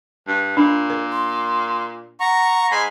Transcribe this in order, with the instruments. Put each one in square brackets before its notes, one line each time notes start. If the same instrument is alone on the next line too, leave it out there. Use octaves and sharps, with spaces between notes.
[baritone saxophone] G2
[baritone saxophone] A#2 [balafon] D4
[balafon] A#4
[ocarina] C6
[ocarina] F#5 [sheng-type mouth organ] A#5 C#6
[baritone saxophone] G#2 [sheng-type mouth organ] G#5 B5 C6